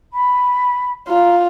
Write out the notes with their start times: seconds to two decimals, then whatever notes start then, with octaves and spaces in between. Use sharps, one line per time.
0.12 B5
1.08 F4 A#5